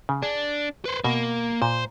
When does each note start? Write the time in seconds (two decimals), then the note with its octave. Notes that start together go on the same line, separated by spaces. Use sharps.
0.09 C#3
0.23 D4 G#4
0.85 B4 C5
1.04 B2 A#3
1.62 A#2 C5